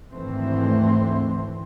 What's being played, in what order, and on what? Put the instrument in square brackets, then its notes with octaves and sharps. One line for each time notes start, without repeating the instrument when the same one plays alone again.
[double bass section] G#1 D2 E3 A3 C4